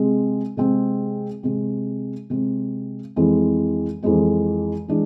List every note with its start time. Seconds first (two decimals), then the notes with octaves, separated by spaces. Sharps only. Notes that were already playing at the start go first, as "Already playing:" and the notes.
Already playing: C3 G#3 C4 G#4
0.57 C3 G#3 C4 G#4
1.43 C3 G#3 C4
2.30 C3 G#3 C4
3.16 F2 E3 G#3 C4
4.03 F2 E3 G#3 C4
4.88 E3 G#3 D4